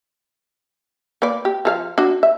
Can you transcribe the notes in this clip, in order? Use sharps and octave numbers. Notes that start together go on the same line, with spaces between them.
A#3 B4 D5
G4
F3 A4 F5
D4 F#4
E5